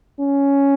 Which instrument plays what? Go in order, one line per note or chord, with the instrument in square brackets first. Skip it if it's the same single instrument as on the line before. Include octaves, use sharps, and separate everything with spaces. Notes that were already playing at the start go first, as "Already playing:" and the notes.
[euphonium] C#4